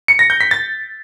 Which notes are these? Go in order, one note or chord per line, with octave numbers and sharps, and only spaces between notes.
C#7
A#6
G6
B6
A6